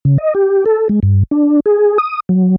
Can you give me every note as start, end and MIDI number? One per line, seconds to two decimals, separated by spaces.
0.05 0.18 49
0.18 0.34 75
0.35 0.64 67
0.66 0.88 69
0.89 1.00 56
1.03 1.23 43
1.31 1.60 62
1.66 1.98 68
1.98 2.20 87
2.29 2.56 54